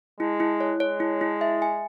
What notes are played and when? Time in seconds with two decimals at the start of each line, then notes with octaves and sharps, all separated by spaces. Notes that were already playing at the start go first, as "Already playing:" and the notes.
0.20 G#3 E4
0.40 E4
0.60 C#5
0.80 G#3 C#5
1.00 E4
1.21 E4
1.41 E5
1.62 G#5